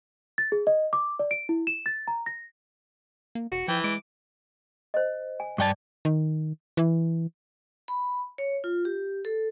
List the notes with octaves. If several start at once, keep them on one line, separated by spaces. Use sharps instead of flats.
A6
G#4
D#5
D6
D5
D7
E4
E7
A6
A#5
A#6
A#3
E1 F#4
E3 F3 G5
G#3 D6
C5 D#5
G#5
G2 D5 G5 A5 D6
D#3
E3
B5
C#5
F4
G4
A4